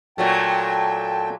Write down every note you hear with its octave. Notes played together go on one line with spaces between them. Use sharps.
A#2 F#3 A3 G5 A5